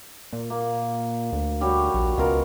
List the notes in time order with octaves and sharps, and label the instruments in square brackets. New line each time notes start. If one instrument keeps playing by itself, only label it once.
[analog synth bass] A#2
[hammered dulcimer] A#3
[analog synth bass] D2
[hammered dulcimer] G3 F#4 C#5
[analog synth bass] A#1
[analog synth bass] C#2 [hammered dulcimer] B2 F4 A#4